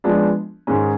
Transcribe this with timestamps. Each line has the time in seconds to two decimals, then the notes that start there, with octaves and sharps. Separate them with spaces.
0.04 F3 G#3 B3 D4
0.67 G#2 D#3 G#3 C#4